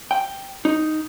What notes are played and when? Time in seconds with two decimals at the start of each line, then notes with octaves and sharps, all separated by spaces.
0.11 G5
0.65 D#4